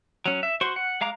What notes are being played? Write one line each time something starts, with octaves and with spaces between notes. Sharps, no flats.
F#3 C#4
E5
F#4 C5 C6 C#6
F#5
G#3 F5 A#5 D6